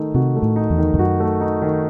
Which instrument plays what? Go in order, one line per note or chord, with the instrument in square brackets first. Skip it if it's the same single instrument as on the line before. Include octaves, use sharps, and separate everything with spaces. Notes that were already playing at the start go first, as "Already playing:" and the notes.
Already playing: [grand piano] D#3 A3 D#4
[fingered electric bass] C3 [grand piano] F#4
[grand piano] A3
[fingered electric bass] A2
[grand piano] D#4
[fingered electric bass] E2
[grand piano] D#3
[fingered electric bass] E2
[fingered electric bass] F#2 [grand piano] F#4
[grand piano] A3
D#4
D#3